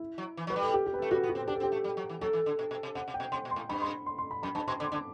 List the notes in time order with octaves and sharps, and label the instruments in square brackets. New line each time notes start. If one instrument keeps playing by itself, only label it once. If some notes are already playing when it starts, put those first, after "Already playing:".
Already playing: [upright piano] E4
[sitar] F#3
E3
[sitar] F#3 [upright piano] B4
[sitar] G3
[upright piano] A4
G4
G4
B4
A4
[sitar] A3
[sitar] G3 [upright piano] F#4
[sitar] B3
[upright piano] F#4
[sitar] C4
[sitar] D4 [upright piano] G4
[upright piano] A4
[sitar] C4
[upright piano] G4
[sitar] A3
G3
F#3
E3
[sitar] F#3 [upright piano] A4
[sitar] E3
D3
B2
B2
C3
[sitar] C3 [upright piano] F#5
[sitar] C3
[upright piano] G5
[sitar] B2
[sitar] C3 [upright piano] C6
[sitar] B2
[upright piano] C6
[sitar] A2
[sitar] G2 [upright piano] B5
[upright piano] C6
C6
C6
B5
[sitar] F#2 [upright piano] B5
[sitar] G2 [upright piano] A5
[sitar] B2 [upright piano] C6
[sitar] D3 [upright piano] D6
[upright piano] C6
[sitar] D3
[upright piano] D6